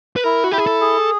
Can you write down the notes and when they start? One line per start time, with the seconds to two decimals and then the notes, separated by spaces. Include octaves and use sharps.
0.16 B4
0.24 E4 A#4
0.44 F#4
0.51 E4 G4
0.58 G#4
0.66 A4
0.81 G#4